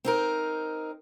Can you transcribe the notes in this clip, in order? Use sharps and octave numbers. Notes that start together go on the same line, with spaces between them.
C4 D#4 A#4